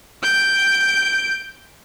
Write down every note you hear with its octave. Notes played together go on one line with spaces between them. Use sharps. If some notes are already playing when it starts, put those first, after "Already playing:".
G6 D7